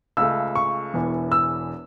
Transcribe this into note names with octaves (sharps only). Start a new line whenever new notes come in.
C#2 C#3 A3 E6
C#6
E1 E2 E3
E6